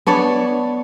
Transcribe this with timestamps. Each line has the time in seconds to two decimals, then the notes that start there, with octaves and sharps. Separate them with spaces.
0.07 B3 D4 C#5 D5